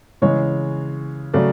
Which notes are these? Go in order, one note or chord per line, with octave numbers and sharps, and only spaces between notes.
C#3 E3 G#3 C#5
C#3 F#3 A3 D5